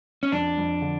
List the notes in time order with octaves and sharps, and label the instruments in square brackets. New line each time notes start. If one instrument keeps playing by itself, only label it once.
[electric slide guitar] C#4
[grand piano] F2 [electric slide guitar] D4
[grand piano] F2
D3